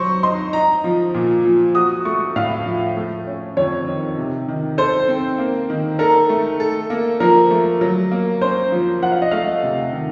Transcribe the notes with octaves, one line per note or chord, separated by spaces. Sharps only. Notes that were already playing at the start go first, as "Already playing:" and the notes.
Already playing: F#3 C5 C#6
D#4 C6
D#4 A#5
F3
A#2
F3
F#4 D#6
A3 C#6
A2 F5
F3
A3
C#4
F2 C#5
D#3
C3
D#3
A4 C5
C4
A#3
D#3
A4 A#4
A3
A4
A#3
F3 A#4
A3
F#3
A#3
C#4 C5
F3
F4 F#5
F5
D#5
A3 F5
C3
D#3